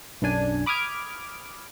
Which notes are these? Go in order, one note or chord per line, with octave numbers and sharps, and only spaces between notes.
B1 F#2 D4 G#5
B5 D6 D#6 F6 G#6 D7